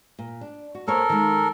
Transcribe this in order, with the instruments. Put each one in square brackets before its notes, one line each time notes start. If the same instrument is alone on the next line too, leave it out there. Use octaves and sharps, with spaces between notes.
[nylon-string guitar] A#2
D4
F#4
[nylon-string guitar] A#3 C5 C#5 [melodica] A4 A#4
[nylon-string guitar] D#3 G#3